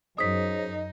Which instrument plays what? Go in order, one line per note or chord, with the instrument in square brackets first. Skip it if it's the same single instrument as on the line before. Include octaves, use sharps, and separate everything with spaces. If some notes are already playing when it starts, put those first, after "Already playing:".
[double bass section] F#2 [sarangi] D#4 [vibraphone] G#4 C5 C#5 [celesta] D#6 B6